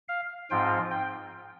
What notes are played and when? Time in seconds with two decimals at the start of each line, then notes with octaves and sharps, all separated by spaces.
0.09 F5
0.50 G#2 F3 C4 F4 G5
0.91 G5